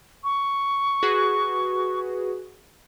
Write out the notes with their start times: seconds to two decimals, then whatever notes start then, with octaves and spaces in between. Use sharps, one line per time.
0.24 C#6
1.03 F#4 G#4 B4